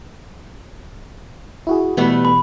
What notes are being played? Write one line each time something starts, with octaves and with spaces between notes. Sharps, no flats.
E4 F#4 G#4
B2 E3 G3 A3 B3
B5